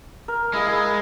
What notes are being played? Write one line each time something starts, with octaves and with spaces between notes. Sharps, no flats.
A#4
G#3 E4 G#4 F5
E4 G#4 A#4